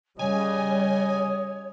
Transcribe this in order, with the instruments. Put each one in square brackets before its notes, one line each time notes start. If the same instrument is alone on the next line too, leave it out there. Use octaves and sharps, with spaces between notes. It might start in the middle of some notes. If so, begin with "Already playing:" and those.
[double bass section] C#3 G3 [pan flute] C#5 [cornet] D#5 [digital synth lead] G#5